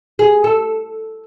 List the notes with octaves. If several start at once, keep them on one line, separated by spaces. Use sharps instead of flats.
G#4
A4